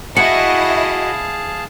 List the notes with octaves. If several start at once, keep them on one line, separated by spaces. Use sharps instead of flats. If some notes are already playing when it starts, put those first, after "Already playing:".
E4 F#4 G#4 D#5 F5 A5 C#7